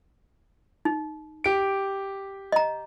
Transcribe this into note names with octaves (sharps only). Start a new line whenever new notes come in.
D#4
G4 D7
D#5 A#5